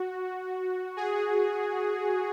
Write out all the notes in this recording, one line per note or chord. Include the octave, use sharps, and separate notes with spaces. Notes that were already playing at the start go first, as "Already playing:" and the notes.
Already playing: F#4
G#4